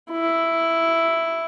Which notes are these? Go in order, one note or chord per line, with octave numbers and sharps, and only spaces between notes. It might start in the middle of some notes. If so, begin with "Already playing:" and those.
E4